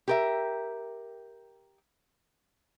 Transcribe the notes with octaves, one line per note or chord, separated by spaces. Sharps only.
G4 A#4 E5